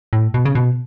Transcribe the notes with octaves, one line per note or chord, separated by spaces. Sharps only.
A2
B2
C#3
B2